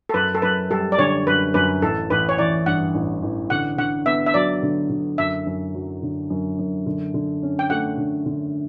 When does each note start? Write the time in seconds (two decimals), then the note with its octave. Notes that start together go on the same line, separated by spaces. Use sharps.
0.09 A4
0.14 F#2 B4
0.35 A4
0.42 F#2 B4
0.70 G3 A4
0.92 D5
0.98 D3 C#5
1.26 F#2 B4
1.54 F#2 B4
1.82 A1 A4
2.10 A1 B4
2.29 C#5
2.38 E3 D5
2.66 G2 F#5
2.95 A1
3.23 A1
3.50 D3 F#5
3.78 D3 F#5
4.06 B3 E5
4.26 E5
4.34 F#3 D5
4.63 D3
4.90 D3
5.18 F#2 E5
5.46 F#2
5.74 F#3
6.03 D3
6.30 F#2
6.59 F#2
6.86 D3
7.14 D3
7.43 C#4
7.59 G5
7.70 A3 F#5
7.98 D3
8.26 D3